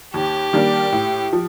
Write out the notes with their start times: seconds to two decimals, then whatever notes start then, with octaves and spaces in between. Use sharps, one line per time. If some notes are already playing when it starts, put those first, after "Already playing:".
0.14 D#2 G4
0.53 D#3 G3 A#3 D4
0.92 A2
1.33 F3